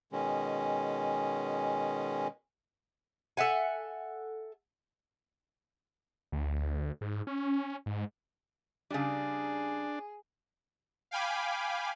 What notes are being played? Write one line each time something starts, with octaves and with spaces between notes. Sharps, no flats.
B2 D#3 G#3 C#4
A4 E5 F#5 G#5
D2
G#2
C#4
G#2
C#3 G3 D4 G#4
F5 G5 G#5 B5 D6